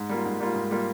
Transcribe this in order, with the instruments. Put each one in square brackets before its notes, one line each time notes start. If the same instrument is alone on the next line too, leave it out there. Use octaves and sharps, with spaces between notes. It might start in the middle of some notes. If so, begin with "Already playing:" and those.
Already playing: [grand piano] G#2
G3 A#3 F4
G#2
G3 A#3 F4
G#2
G3 A#3 F4